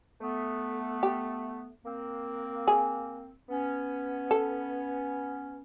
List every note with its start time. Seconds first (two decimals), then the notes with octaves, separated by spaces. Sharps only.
0.21 A3 B3
1.03 G4
1.85 A#3 C4
2.68 G#4
3.49 B3 C#4
4.31 A4